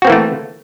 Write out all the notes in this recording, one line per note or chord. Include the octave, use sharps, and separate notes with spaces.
E3 A3 A#3 C4 F#4